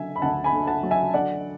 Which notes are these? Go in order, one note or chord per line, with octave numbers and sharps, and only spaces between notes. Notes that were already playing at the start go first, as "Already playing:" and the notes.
Already playing: D3 F#3 E5 G#5
B5
D2 F#5 A5
G#5 B5
D3
F#5 A5
F#3
E5 G#5
D3 D5 F#5